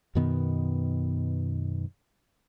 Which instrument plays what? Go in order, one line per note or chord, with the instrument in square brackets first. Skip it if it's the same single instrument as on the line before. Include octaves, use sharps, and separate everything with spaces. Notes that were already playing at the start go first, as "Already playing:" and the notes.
[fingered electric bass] F#2 B2 D#3 B3